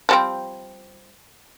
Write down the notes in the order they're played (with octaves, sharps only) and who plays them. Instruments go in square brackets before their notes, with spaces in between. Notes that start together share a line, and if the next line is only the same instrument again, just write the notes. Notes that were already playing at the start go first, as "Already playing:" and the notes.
[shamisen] F3 G3 C4